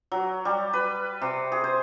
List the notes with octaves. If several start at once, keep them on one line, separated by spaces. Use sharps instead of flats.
F#3
G3
B4
C3
G#4
C5